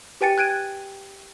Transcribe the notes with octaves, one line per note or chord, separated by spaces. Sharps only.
G4 B4 G5 G#5 A6 C#7
G5 F#6 G#6 D7 D#7